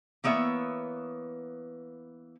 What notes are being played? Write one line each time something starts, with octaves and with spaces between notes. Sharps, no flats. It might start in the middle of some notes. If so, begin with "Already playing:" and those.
E3 A#3 B3 C#5 E5